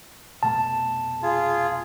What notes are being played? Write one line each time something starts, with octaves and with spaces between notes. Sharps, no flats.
F1 B2 A3 A5
F4 G#4